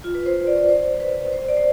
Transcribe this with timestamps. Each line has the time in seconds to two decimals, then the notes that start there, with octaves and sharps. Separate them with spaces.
0.04 F4
0.15 B4
0.26 C5
0.47 D5
0.58 D5
0.69 C5
1.00 B4
1.32 C5
1.48 D5
1.57 C5